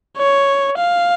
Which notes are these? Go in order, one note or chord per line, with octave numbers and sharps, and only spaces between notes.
C#5
F5